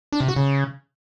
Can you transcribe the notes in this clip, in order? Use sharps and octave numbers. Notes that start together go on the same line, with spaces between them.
D4
C3
F#4
C#3